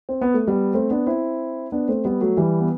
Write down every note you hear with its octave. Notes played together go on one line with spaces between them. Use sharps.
C4
B3
A3
G3 B3
A3 C4
B3 D4
C4 E4
B3 D4
A3 C4
G3 B3
F#3 A3
E3 G3
B3